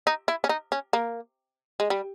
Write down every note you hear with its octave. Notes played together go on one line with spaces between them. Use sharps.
D#4
E4
C#4
D#4
C#4
A#3
G#3
G3